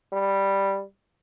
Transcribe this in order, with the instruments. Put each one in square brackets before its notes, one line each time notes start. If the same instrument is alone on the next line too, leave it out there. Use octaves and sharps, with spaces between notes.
[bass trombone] G3